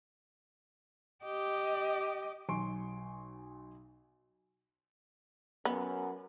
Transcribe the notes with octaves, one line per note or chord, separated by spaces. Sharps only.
G4 D#5
B1 F#3 G#5 C6 C#6 D7
F#2 B3